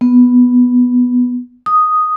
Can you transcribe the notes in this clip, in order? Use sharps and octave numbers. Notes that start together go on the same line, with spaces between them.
B3
D#6